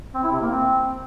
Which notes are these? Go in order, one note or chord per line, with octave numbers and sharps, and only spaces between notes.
C4
E4
C3
A#3
C4